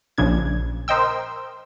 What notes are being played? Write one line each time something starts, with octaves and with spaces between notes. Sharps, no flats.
A#1 C#3 D4 G#6
A#4 C5 D#5 G5 E6